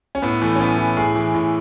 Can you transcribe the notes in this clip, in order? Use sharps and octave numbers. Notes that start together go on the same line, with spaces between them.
C#4
A2 B3
E3 A3
C#4
A2 B3
E3
A2 G#4
E3
A2